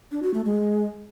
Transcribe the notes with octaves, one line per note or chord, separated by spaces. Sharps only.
D4
F#4
A3
G#3